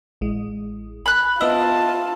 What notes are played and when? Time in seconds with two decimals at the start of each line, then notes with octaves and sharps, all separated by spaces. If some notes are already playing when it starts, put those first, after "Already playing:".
0.21 A1 G#3
1.06 G#5 B5 F#6
1.41 B3 E4 F4 D#5 A5